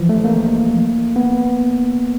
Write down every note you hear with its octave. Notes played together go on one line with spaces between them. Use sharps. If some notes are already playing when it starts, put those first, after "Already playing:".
Already playing: E3 F3
A3
A#3
B3